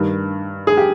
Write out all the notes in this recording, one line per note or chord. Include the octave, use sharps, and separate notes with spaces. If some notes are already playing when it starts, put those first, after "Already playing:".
Already playing: G2 D#3
G#4
G4